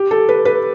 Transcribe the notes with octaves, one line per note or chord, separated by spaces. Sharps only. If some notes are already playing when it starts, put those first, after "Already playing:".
Already playing: G4
A4
B4
B4